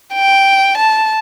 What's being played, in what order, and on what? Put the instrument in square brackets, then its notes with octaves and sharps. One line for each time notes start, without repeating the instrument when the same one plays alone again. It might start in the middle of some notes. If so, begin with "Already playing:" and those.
[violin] G5
A5